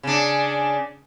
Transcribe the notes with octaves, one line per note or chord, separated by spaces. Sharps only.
C#3 D4